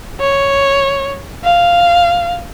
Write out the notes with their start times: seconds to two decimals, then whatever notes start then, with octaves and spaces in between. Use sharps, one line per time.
0.21 C#5
1.44 F5